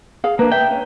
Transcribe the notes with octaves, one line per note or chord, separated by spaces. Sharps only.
G#4 F5
A#3 D4 B4
E5 G5
C#4